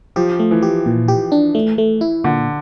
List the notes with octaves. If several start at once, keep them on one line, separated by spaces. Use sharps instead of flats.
F3 G4
A3
E3
G4
A#2
G4
D4
A3
A3
E4
A#2 D3